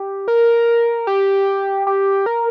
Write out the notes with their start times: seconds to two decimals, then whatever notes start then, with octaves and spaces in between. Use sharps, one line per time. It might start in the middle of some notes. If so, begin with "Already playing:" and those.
Already playing: G4
0.28 A#4
1.07 G4
1.87 G4
2.26 A#4